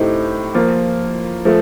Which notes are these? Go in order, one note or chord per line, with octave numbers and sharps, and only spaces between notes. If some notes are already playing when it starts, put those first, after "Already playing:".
Already playing: A2 A3 C4 D#4 G4
F3 A#3 F4
F3 A3